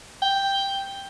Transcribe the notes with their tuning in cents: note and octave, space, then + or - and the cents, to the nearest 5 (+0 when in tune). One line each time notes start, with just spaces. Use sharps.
G5 +5